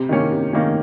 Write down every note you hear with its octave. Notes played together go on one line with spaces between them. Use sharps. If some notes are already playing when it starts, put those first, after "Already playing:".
Already playing: C3
D#3 A#3 C#4
C3
D#3 A#3 C#4